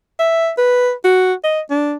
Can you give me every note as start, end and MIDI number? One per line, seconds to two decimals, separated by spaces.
0.20 0.50 76
0.58 0.92 71
1.05 1.33 66
1.44 1.61 75
1.71 1.95 62